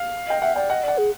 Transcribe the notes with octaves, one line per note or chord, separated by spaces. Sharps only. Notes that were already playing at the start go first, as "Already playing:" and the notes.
Already playing: F5
D#5 G5
E5 F#5
D5 G5
D#5 F#5
D5 F#5
G#4